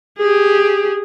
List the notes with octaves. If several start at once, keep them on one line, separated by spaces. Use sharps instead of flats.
G4 G#4